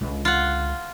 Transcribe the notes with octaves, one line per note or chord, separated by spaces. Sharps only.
C#2 D3
F4 F#5